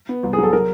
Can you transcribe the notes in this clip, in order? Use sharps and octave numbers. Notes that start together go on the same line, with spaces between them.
B3
C2
G#4
F#3
A4
F#3 A#4